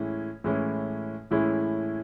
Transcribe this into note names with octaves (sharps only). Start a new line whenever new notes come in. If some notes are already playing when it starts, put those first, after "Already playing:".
Already playing: A2 E3 G#3 C#4 E4
A2 E3 G#3 C#4 E4
A2 E3 G#3 C#4 E4